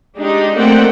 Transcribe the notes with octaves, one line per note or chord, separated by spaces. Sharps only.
G#3 D4 D#4 G4
A3 A#3 C4 D5 F#5 G5